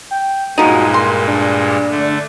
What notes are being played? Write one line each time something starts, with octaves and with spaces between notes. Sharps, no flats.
G5
G2 A#2 F3 G#3 D#4 F#4
A#4 C6
D4
D3 A3